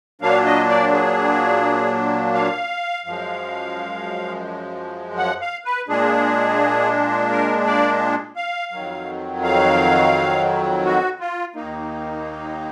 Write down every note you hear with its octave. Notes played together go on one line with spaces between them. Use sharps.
A#2 F#3 A#3 D4 F5
D#5
D5
G#4
F5
F#2 F3 G#3
F#5
F5
B4
A#2 G#3 D4 G#4
A#4
D5
F5
F2 D#3 F#3
F5
F#4
F4
D#2 D#3 A#3 D#4